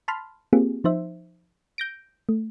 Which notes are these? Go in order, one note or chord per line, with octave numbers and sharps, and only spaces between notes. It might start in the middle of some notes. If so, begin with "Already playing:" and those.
A5 B5 C6 F6
A#3 C4 F4 G4 G#4
F3 D#4 C5 E5
G6 A#6 D7
A3